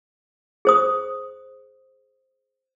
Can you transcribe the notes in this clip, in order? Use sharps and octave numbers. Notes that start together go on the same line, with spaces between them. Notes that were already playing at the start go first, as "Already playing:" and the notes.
G#4 C5 D#6